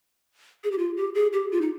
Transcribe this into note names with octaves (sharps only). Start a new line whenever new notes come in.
G#4
G4
F4
G4
G#4
G4
F4
D#4